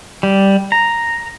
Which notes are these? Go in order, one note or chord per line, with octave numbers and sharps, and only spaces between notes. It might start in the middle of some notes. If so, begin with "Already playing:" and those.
G3
A#5